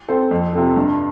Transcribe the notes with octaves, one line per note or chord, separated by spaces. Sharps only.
C4 A4 C5
F2
C3 F3 C4 A4
G2